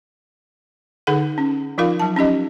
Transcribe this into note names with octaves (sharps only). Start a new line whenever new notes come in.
D3 D#4 G#4 A4 F#5
C#4
F3 D#4 F4 A#4 F5
F#3 A5
C#4 D#4 G4 D#5